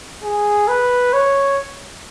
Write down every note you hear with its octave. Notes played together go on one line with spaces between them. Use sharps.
G#4
B4
C#5